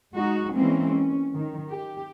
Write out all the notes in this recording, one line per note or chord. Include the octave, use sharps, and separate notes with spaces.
G#3 D#4 F#4
E3 G#3 A#3 C4 C#4
C#4
D#3
G4